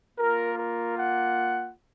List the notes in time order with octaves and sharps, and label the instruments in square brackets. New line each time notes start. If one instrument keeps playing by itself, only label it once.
[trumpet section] A#3 F4 A#4
A#4
F#5